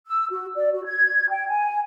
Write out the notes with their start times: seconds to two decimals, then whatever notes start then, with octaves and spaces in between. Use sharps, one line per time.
0.07 E6
0.31 F#4
0.55 D5
0.72 F#4
0.85 G#6
1.30 G5
1.48 G#5